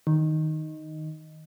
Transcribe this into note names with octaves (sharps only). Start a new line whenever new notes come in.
D#3